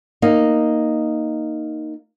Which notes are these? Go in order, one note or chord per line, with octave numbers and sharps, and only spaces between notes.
A#3 D#4